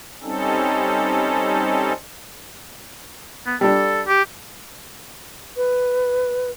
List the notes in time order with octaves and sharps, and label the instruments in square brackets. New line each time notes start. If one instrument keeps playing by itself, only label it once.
[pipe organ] G3 C4 C#4 D#4 A4
[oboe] B3
[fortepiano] G3 D4 [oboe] A4
[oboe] G4
[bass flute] B4